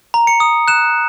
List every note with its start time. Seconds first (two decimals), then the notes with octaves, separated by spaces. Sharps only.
0.14 A#5
0.27 C#7
0.40 D#6
0.68 F#6 E7